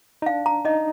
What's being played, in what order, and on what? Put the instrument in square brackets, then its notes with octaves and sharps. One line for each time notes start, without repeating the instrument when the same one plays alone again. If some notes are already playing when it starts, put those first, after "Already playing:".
[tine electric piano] D#4
[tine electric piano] D4 [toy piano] F5
[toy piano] A#5
[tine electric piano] D#4 [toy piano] D#5